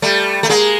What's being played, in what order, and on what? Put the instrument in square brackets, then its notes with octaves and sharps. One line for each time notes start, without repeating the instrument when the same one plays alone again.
[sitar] G3 A3
A3
G#3 A#3